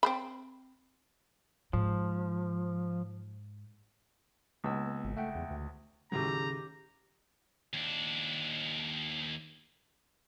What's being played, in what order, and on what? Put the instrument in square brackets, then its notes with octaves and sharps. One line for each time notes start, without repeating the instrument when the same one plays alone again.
[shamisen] C4 C5 B5
[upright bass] G#2 [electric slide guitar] F3
[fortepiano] C#2 [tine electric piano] A#3 B3 E6
[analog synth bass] G#1
[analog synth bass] A3 [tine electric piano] E5 F#5 G5
[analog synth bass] E2
D2
[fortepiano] D#2 A2 F#3 [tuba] C#3 [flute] G4 [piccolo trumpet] A#5
[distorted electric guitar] D#2 D4